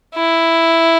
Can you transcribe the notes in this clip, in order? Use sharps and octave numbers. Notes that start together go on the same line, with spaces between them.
E4